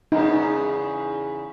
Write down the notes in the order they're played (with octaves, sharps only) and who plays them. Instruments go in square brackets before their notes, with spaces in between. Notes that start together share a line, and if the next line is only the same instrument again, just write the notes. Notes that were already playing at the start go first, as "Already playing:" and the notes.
[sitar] E2 C#3 B3 [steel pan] D#4